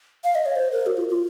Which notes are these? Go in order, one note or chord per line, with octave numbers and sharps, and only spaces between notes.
F5
D#5
C#5
C5
A#4
F#4
F4
F4